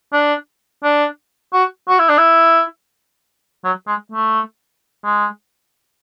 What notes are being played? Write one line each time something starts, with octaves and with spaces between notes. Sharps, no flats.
D4
D4
F#4
F#4
E4
D4
E4
F#3
G#3
A3
G#3